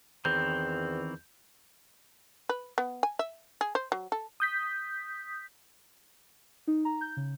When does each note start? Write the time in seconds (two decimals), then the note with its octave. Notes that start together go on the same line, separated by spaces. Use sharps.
0.25 E2 D#3 E3 C4 G6
2.49 B4
2.78 B3
3.03 G#5
3.19 E5
3.61 G#4
3.75 C5
3.92 F#3
4.12 A4
4.40 D#6 G6 B6
6.67 D#4
6.85 A#5
7.01 G6
7.17 C#3